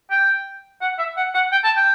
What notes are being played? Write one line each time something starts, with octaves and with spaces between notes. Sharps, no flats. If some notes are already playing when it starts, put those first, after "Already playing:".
G5
F#5
E5
F#5
F#5
G5
A5
G5